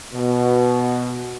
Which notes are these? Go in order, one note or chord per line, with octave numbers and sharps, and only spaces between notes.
B2